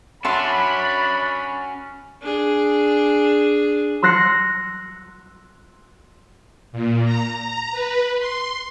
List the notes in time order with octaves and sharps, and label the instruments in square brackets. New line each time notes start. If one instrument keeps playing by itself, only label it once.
[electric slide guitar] C#4 F#4 [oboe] D4 [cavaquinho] E5 A5 C6 [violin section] B5
[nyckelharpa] D4 G#4
[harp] C6 E6 F#6 A#6 C7 C#7
[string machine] A#2
A#5
A#5
B4
C6